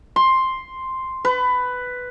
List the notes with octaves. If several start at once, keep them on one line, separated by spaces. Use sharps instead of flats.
C6
B4